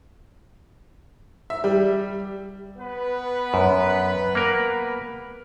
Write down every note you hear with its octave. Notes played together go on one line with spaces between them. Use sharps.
E5
G3
B3 B4
F#2
A#3 A#4